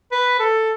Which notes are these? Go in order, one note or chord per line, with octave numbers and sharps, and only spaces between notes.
B4
A4